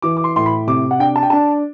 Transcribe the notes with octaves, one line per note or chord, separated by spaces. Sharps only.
E3 D6
D6
C6
A2 C6
B5
C3 D6
F#5
D4 G5
A5
G5
D4 A5